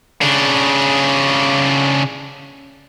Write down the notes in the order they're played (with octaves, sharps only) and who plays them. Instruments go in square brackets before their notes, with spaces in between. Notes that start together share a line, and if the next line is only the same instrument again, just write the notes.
[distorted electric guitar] C#3 D4